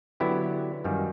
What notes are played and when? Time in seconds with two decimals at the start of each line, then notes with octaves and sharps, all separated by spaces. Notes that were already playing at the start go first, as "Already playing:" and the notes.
0.20 D3 F#3 B3 E4 G4
0.84 F#2 D#3 G3 A#3